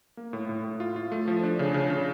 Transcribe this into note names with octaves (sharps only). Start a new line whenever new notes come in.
A#3
A2
A2
A2
F4
F4
A3
F3
D4
C#3
C#3
C#3